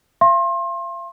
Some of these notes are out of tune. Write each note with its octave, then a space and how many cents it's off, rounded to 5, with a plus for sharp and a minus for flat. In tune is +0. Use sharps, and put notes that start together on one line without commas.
F5 -40 C6 +30